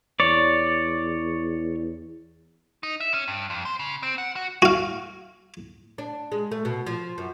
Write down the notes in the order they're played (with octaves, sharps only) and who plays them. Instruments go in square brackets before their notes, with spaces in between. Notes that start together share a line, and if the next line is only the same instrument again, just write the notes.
[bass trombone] E2 [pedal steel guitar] C#5 D5
[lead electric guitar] D#4
E5
C#4
G2
F2
C5
C#3
C4
F#5
F#4
[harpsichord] F#4 F5
[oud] D4
G#3
A3
B2
F3
F#2